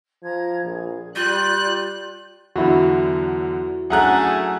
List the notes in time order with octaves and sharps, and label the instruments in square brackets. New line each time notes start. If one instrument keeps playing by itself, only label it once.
[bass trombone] F3 [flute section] A#5 G#6
[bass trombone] A#1 [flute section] G#4
[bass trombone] G3 [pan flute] F4 [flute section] D5 G6 [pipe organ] F#6
[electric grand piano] E2 D3 F#3 [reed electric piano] E4 F#4
[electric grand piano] F#3 C#4 D4 [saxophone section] A3 G#4 [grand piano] F#5 A#5 F#6